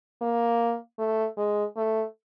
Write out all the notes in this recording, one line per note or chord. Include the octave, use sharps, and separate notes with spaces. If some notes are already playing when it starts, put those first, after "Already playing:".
A#3
A3
G#3
A3